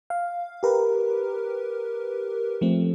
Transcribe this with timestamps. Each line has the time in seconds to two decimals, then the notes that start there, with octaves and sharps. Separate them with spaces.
0.10 F5
0.63 G4 A#4 B4
2.61 F3 A3 C4